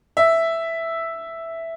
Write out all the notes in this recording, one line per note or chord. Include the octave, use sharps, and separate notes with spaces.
E5